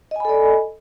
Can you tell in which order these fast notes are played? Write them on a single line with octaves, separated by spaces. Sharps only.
D#5 G#5 B5 A4 D5